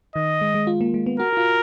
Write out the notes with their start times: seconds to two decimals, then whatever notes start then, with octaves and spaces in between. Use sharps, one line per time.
0.16 D#3 D#5
0.41 G#3
0.54 G#3
0.67 F4
0.81 A#3
0.94 G#3
1.06 B3
1.20 F#4 A#4
1.33 F#4
1.37 F4